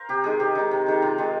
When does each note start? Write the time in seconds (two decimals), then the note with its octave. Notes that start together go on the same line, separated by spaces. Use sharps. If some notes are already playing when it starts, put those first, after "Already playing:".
Already playing: A#4 C5 F5
0.09 C3 G4
0.24 D#3 G#3 G#4
0.40 C3 G4
0.55 D#3 G#3
0.71 C3
0.86 D#3 G#3
1.02 C3 F4
1.18 D#3 G#3